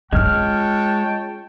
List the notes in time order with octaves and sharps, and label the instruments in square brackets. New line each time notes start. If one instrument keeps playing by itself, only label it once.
[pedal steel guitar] G#3 F6 [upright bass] C#4 F4 [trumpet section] C#5 G5 A5